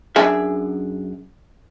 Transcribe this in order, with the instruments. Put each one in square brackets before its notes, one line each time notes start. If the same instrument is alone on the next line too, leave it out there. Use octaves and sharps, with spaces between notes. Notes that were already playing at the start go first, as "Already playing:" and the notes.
[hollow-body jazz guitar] F#2 D4 G#4 E5